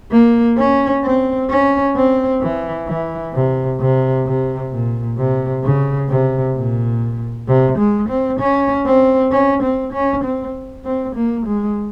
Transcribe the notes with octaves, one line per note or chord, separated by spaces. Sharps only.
A#3
C#4
C4
C#4
C4
E3
E3
C3
C3
C3
A#2
C3
C#3
C3
A#2
C3
G#3
C4
C#4
C4
C#4
C4
C#4
C4
C4
A#3
G#3